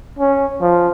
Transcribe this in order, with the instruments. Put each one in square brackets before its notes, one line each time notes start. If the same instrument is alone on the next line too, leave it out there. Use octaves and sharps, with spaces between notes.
[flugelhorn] C#4
F3